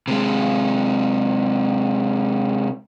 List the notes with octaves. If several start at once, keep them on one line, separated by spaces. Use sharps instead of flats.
C3 G#3